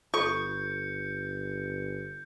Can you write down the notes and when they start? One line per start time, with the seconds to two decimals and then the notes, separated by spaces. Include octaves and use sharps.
0.14 G1 F4 A4 C#6 G6 C#7